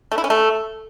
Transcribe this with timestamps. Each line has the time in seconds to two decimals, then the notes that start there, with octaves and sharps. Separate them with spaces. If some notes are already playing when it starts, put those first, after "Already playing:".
0.12 A3
0.18 E4
0.24 C#4
0.30 A3